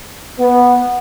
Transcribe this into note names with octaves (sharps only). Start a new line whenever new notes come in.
B3